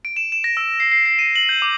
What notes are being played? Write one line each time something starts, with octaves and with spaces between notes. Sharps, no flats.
D7
E7
E7
A#6
E6
C7
C7
C7
D#7
F#7
G6
D6